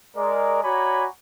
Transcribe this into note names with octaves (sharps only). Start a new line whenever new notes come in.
G#3 A#4 D5
F#4 C#5 D5 G#5 A#5 B5